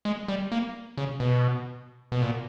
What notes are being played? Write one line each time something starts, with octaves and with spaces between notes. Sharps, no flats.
G#3
G3
A#3
C#3
B2
B2
A#2